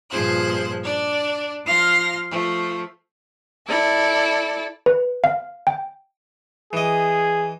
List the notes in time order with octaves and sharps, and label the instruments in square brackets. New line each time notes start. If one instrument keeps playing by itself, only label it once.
[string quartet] G2 A#2 F3 G#4 C5 F#6
D4 D5
F3 F5 C6 F6 A#6
F3 A3
E4 A4 D5
[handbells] B4
F5
G5
[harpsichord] E3 D#5 [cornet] G#4